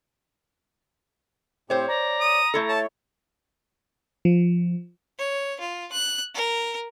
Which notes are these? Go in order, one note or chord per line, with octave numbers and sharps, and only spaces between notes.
A2 C4 G4 C5 C#5
D5 A#5
D#6
A3 E4 A4
C#5 A5
F3
C#5
F4
F#6
A#4